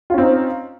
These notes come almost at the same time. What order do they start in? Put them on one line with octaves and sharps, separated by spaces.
F4 C#4 C4 D#4